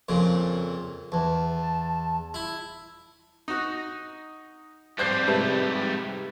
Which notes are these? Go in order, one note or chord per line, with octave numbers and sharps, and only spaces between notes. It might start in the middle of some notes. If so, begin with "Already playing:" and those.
F2 A#2 C#3
E2 A5
E4
D#4 F#4
F2 G3 C5 D6 G6 C7
G#2 C3 A3 B4